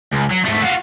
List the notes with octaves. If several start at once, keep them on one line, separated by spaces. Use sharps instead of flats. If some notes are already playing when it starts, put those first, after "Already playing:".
C#2
F#3
G#2 A3
F4 F#4